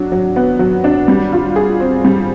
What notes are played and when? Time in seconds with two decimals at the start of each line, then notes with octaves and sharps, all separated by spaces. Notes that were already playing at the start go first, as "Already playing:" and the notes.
Already playing: F#3 D4
0.12 F#3
0.36 B3
0.59 F#3
0.84 D4
1.08 G3
1.32 F4
1.56 G#4
1.80 C4
2.04 G3